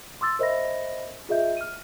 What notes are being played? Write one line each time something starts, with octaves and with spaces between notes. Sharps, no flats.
C6 D6 E6 A6
A#4 C5 D#5 E5 B5 A#6
F4 G#4 D#5 E5 G6
F6 D#7